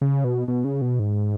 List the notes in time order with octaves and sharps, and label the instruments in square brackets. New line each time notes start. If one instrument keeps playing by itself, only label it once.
[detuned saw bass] C#3
B2
B2
C#3
B2
G#2